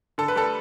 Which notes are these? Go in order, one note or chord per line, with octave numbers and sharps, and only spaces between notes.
D3 A4
B4
G3 A4